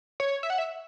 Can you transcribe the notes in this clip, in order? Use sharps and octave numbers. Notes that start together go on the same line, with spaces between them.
C#5
E5
F#5
E5